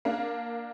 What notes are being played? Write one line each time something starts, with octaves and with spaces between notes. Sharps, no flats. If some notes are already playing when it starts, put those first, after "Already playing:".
A#3 D4